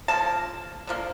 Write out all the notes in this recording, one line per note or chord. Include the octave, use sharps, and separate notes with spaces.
D3 F3 A#3 A5
D3 F3 A#3